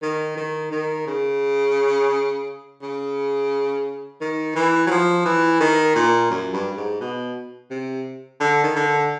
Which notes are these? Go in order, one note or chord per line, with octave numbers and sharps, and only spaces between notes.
D#3
D#3
D#3
C#3
C#3
D#3
E3
F#3
F3
E3
D#3
A#2
F#2
G2
G2
G#2
B2
C3
D3
D#3
D3